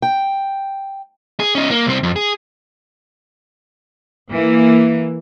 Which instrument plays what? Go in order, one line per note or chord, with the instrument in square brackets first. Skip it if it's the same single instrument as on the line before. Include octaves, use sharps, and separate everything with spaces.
[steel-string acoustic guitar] G5
[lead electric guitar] G#4
C#4 D#4
A#3
C2 C4
F2
G#4
[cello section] E3 A#3